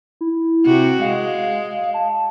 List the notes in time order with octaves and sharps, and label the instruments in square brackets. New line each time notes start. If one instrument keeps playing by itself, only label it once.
[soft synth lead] E4
[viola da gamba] C3 F#4
[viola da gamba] G#3 [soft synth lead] F5
[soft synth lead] A5